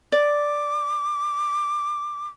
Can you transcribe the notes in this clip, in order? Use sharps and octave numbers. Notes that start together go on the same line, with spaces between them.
D5 D6